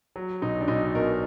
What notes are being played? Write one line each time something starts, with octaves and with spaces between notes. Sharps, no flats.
F#3
B1 D#4
D4
B1 D#4
B2 A#4